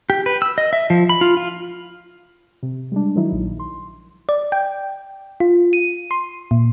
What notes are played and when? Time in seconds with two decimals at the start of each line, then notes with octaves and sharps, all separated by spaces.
0.10 G4
0.26 B4
0.42 E6
0.58 D#5
0.73 E5
0.90 F3
1.09 B5
1.21 F4
1.37 F4
2.63 C3
2.92 G3 G#3 D4
3.15 D#3 F#3 D#4 E4
3.32 A#1
3.60 C6
4.29 D5
4.52 G5
5.40 F4
5.73 D#7
6.11 C6
6.51 A#2